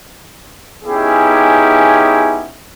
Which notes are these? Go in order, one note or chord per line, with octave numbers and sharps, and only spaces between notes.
B3 C#4 D#4 E4 G4 G#4